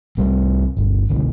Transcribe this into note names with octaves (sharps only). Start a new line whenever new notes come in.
C2 G3 A3 C4
G1 D2
C#2 B2 D3